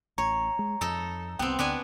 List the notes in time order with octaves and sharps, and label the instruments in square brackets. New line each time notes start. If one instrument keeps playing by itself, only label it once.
[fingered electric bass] A1 [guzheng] C#5 [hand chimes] A#5
[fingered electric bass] G#3
[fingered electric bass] F2 [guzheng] D#4 A4
[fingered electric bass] C2 [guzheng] B3 C4 [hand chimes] G5
[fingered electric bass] D2 [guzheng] B3 D4 G#5